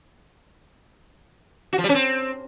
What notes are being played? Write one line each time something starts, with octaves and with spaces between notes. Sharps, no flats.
F#4
F3
G3
C#4
C4